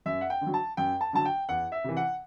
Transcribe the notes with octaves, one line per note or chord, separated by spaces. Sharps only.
F#2 E5
F#5
G5
D3
F#3
A5
F#2 G5
A5
D3 F#3 A5
G5
E2 F#5
E5
C3 E3
F#5